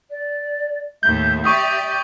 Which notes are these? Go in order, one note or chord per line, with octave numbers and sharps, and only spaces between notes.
D5
D#2 A2 E5 G6
G4 D5 C#6 D#6